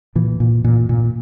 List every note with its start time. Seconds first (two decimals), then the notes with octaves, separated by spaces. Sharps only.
0.15 A#2 E3
0.40 A#2
0.64 A#2
0.89 A#2